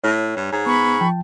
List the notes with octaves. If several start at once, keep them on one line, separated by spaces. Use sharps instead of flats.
A2 C#5
G2
G#2
B3 B5 C#6
F3 G5 A5